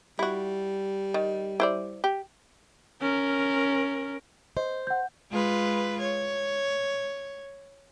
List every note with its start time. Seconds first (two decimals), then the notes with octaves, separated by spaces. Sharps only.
0.19 G3 E4 F#4
1.14 D#3
1.60 E4 C5 D5
2.04 G4
3.01 C#4 A#4
4.57 C5 D#5
4.87 F#5 G6
5.31 G#3 F4 B4
6.00 C#5